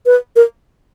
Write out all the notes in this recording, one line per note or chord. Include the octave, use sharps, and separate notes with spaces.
B4
A#4